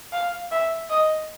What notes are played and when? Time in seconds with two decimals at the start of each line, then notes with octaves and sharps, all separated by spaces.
0.12 F5
0.51 E5
0.90 D#5